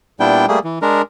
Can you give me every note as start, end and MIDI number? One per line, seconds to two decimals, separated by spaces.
0.20 0.46 46
0.20 0.46 55
0.20 0.46 59
0.20 0.46 62
0.20 0.46 64
0.20 0.46 79
0.48 0.59 55
0.48 0.59 57
0.48 0.59 58
0.48 0.59 68
0.64 0.79 52
0.82 1.02 56
0.82 1.02 62
0.82 1.02 70